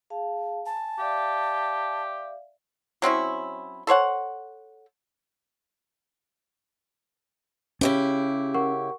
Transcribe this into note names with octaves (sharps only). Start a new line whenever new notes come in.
G#4 F5 A5
G#5 A5
G4 D5 E5 F5
F#3 C4 C#4 E4
A4 C5 C#5 F#5
C#3 C#4 E4 G4
A#4 F#5 C#6